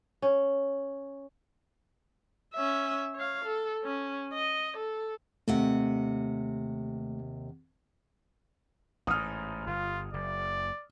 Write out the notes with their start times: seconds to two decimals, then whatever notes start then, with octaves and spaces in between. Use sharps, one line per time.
0.22 C#4
2.54 C#4 E5
3.15 C#5 F5
3.45 A4
3.84 C#4
4.33 D#5
4.77 A4
5.48 D#2 C3 A3 F#5
9.07 A1 G#2 D#6 F6
9.67 G1 F4
10.14 F#1 D5